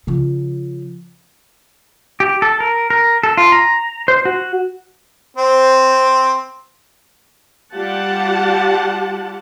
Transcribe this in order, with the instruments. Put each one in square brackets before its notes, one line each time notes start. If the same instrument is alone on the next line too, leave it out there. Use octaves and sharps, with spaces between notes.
[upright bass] C#3 F3
[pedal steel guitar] G4
A4
A#4
A#4
A4
F4
A#5
C5
F#4
[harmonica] C4 [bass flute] C5
[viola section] G3 F4 G4 F#5 A5